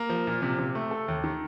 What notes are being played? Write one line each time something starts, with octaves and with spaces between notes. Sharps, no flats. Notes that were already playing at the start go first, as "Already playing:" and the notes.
Already playing: A#3
F3
A#2
C3
C3
A3
A4
D#2
D#3